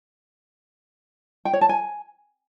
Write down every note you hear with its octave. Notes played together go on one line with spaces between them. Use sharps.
G5
C#5
A5
G#5